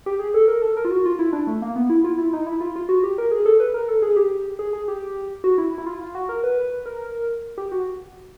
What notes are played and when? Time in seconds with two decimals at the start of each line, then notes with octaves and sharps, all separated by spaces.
0.06 G4
0.19 G#4
0.34 A4
0.48 A#4
0.62 A4
0.77 A#4
0.85 F4
0.91 F#4
1.05 F4
1.19 E4
1.33 D4
1.47 A3
1.62 A#3
1.76 B3
1.90 E4
2.04 F4
2.18 E4
2.33 D#4
2.47 E4
2.61 F4
2.76 F4
2.89 F#4
3.04 G4
3.18 A#4
3.31 G#4
3.46 A4
3.60 B4
3.74 A#4
3.88 A4
4.02 G#4
4.16 G4
4.59 G#4
4.73 G#4
4.88 G4
5.44 F#4
5.58 E4
5.78 E4
5.86 F4
6.02 F4
6.15 F#4
6.29 A#4
6.44 B4
6.86 A#4
7.58 G4
7.72 F#4